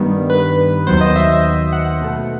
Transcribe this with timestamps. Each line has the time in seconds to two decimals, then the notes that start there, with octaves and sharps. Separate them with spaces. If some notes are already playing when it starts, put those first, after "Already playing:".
Already playing: G2 D#3 G3 B3
0.30 B4
0.87 D#2 D#3 F#3 B3 C5
1.01 D#5
1.16 E5
1.73 F#5
2.01 B2 A3